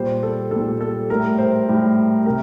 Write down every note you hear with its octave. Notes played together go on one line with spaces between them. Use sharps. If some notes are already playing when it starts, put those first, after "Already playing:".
Already playing: A#2 G3 C5
A4
A#2 G3 A4
A4
A2 G3 A#4
C5
A2 G3
C3 A#4